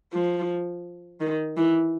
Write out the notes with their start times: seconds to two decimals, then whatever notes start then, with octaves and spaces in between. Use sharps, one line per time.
0.13 F3
1.20 D#3
1.57 E3